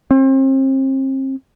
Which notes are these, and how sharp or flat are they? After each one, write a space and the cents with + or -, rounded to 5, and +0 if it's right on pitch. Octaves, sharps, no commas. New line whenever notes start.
C4 +35